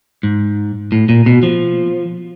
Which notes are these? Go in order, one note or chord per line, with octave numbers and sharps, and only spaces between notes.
G#2
A2
A#2
B2
F3